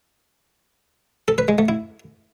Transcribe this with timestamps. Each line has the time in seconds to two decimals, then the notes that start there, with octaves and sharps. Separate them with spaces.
1.28 A4
1.38 B4
1.48 G#3
1.58 A3
1.69 E4